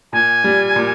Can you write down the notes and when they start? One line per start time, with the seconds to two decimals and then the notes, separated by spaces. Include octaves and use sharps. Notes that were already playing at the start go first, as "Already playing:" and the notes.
0.13 A#2 G#5
0.44 G3
0.76 A#2